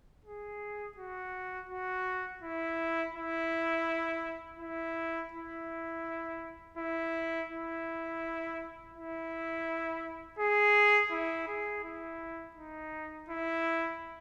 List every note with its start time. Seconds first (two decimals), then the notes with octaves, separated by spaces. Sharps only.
0.25 G#4
0.97 F#4
1.69 F#4
2.43 E4
3.15 E4
4.59 E4
5.32 E4
6.77 E4
7.49 E4
8.94 E4
10.39 G#4
11.11 E4
11.48 G#4
11.84 E4
12.56 D#4
13.29 E4